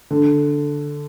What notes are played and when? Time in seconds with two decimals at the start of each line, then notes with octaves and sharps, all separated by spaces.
0.11 D3